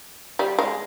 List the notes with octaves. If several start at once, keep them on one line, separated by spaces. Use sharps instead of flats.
G3
G#3